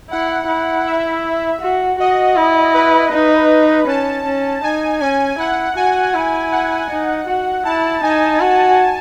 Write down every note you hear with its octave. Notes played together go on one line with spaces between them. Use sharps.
E4 F#5
E4
E5
F#4
F#4 D#5
E4
B4
D#4
C#4 A5
C#4
D#4 G#5
C#4 G#5
E4 F#5
F#4 G#5
E4
F#5
D#4
F#4
E4 A5
D#4 G#5
F#4